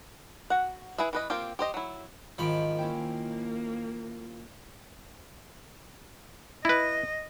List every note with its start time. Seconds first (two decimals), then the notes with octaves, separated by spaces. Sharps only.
0.50 F#4 F#5
0.98 E4 G#4 B4 E5
1.13 E3 B4 D#5
1.30 A#3 C4 F4 G4
1.59 G4 C5 D#5
1.74 F#3 E4
2.38 G#1 D#3 F3 B5 D7
2.79 A#3 C#4 E4 G5
6.65 E4 B4 D#5